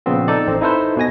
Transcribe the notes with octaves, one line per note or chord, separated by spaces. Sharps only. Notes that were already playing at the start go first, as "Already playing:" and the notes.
A#2 C#3 F3 B3 C4
D#4 A4 D5
A1 C4
D#4 E4 A4 B4 C5
B2 F#4 G#5 A#6